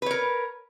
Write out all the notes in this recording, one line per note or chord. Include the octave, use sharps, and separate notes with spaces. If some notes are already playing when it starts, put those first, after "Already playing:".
A#4 B4 C#5